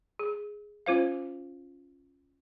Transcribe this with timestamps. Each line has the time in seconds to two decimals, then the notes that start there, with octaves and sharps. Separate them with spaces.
0.19 G#4
0.86 C#4 F4 C5 F5